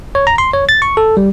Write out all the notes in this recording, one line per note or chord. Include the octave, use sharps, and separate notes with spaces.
C#5
A#5
C6
C#5
A6
C#6
A4
G3